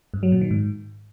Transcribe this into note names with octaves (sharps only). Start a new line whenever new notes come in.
G2
F#3
A#2
D#3
G#2